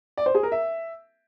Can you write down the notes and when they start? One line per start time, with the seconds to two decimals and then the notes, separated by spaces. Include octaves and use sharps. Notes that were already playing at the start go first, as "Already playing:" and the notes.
0.17 D5
0.26 C5
0.35 G#4
0.43 A#4
0.52 E5